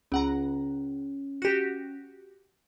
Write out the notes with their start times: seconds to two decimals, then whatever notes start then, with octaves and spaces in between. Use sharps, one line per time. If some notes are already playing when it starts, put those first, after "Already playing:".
0.12 C#2 C#4 F#5 A#5
1.42 F#4 G4